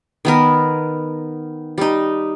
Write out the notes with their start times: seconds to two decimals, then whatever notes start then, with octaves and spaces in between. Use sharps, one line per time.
0.25 D#3 B3 A#4
1.78 G3 D#4